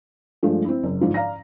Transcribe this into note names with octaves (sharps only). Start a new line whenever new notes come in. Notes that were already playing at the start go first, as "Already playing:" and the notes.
G2 F3 G#3 A3
C4 E4
F#1
G#2 D3 F3
D5 F5 A#5 A#6